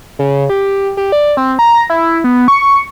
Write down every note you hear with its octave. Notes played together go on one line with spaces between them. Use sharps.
C#3
G4
G4
D5
C4
A#5
E4
B3
C#6